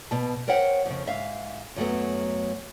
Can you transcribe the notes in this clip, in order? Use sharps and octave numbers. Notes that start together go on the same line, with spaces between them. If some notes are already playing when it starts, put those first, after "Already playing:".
B2 A5
A#4 C5 C#5 E5 F#5 G5
F2 C#3
G#2 E5 F5
F#2 F#3 A3 B3